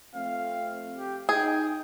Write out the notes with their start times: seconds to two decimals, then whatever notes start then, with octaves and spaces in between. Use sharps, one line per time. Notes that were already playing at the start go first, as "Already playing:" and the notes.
0.15 F3 A3 C4 F5
0.97 G4
1.29 D#4 G#4 G5